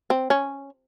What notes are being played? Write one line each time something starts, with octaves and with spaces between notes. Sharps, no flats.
C4
C#4